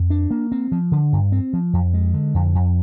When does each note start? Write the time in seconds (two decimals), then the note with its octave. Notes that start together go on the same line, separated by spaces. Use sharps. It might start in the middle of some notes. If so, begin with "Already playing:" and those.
Already playing: F2
0.10 D4
0.31 A#3
0.52 C4
0.72 F3
0.92 D3
1.12 G2
1.32 C4
1.53 F3
1.73 F2
1.94 G#3
2.14 D3
2.34 F2
2.55 F2